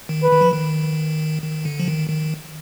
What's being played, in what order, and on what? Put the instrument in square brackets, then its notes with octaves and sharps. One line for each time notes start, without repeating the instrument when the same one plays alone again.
[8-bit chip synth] D#3
[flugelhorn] B4
[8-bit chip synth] D#3
F3
D#3
D#3
D3
F3
D#3
D#3